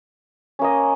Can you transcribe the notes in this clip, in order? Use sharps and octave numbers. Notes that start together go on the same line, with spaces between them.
A#3 C#4 D#5